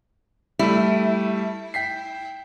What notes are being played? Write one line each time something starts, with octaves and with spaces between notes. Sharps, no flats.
G3 A3 E4
G5 B6 C7